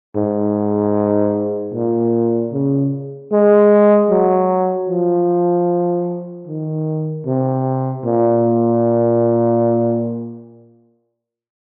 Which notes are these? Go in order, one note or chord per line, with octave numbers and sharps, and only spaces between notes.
G#2
A#2
C#3
G#3
F#3
F3
D#3
C3
A#2